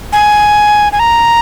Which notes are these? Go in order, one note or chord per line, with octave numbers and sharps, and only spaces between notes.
G#5
G#5
A#5